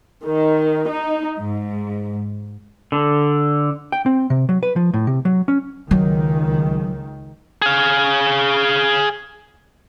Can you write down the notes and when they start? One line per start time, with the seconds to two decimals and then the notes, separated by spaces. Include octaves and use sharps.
0.24 D#3
0.89 D#4
1.40 G#2
2.92 D3
3.92 G5
4.06 C4
4.30 C3
4.49 F#3
4.63 B4
4.76 F3
4.94 A2
5.07 C3
5.25 F#3
5.48 C#4
5.91 C#2 D#3 F#3
7.62 G#4 F5